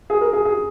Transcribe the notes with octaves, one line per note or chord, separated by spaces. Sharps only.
G#4
A#4
G#4
G#4